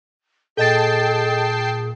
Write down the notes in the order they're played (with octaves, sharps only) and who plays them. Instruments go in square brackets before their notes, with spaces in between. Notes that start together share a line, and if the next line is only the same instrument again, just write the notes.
[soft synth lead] A#2 [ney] G#4 [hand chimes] A4 D#5 A6 [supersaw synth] G5 A5 C7